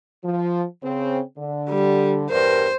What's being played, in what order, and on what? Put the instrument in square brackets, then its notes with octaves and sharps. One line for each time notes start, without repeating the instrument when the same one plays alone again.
[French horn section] F3
C#3 C4
D3
[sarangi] G3
[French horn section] E2 G2 A#4 [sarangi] C5